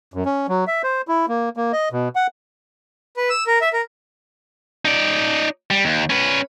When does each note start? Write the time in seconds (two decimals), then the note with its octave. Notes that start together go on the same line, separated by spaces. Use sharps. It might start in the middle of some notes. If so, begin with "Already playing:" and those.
0.14 F#2
0.26 C#4
0.48 F#3
0.67 E5
0.83 C5
1.08 E4
1.28 A#3
1.57 A#3
1.72 D#5
1.92 B2
2.15 F#5
3.17 B4
3.30 E6
3.47 A#4
3.62 E5
3.73 A#4
4.85 D#4 D5
5.71 G3
5.85 D#2
6.10 C#4 B4